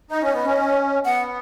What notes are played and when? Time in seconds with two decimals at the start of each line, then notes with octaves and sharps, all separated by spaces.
0.11 D#4 D#5
0.22 C#4
0.34 B3
0.45 C#4
1.05 B3 F#5